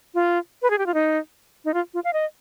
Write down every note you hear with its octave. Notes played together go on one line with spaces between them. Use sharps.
F4
B4
G#4
G4
F4
D#4
D#4
F4
F4
F5
D#5